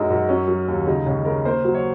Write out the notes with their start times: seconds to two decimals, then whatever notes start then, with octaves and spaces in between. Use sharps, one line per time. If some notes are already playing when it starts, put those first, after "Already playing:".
Already playing: F#2 F#3 G#3 D#4
0.10 F#2
0.29 F#3 C#4
0.48 F#3
0.68 D#2
0.87 C#3 D#4
1.06 C#2 C#4
1.25 C#3 A#4
1.45 A#3 C5
1.64 F#3
1.75 C#5